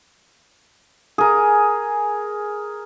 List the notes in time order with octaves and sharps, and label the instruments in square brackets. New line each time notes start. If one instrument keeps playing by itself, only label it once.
[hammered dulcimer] G#4 A#4